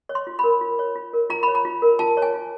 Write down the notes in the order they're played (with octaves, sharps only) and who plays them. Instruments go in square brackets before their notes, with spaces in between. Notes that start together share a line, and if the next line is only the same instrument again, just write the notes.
[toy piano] C#5
C6
F4
A#4 B5
F4
C#5
F4
A#4
F4 A#5
C#5 B5
A#5
F4
A#4
F4 A5
C#5
G#5
F4